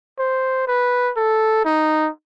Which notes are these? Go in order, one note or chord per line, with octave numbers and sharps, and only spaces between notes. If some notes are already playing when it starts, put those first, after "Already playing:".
C5
B4
A4
D#4